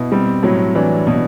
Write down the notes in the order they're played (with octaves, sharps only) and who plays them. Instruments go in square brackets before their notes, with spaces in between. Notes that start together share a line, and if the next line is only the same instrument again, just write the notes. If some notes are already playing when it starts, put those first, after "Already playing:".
Already playing: [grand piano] B2 E4
[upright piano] G3 [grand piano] C4
[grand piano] A2 [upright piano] F#3
[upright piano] E3 [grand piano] D4
[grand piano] B2